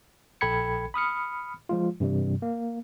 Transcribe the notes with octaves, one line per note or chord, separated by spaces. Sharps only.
A#1 A4 G5 B5 G#6 C#7
B5 D#6 F6 C#7
F3 G#3 F4
G2 C3 E3 G3
A#3